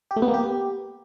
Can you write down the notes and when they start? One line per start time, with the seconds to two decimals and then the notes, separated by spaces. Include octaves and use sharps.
0.11 G4
0.16 A3
0.22 B3
0.28 A#3
0.34 G4